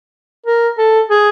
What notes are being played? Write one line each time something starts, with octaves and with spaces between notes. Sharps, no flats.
A#4
A4
G#4